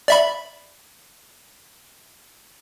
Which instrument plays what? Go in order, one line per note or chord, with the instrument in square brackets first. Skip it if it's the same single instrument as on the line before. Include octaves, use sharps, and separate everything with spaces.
[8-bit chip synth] D5 E5 B5